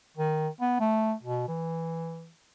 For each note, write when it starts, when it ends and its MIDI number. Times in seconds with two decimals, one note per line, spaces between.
0.17 0.49 51
0.61 0.75 59
0.80 1.13 57
1.23 1.47 47
1.48 2.30 52